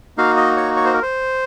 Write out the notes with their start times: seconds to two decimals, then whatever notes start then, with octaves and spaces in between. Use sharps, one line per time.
0.18 A#3 D#4 F#4 F5
0.37 D#5
0.56 C#5
0.76 C#5
0.85 C5
0.94 A#4
1.02 C5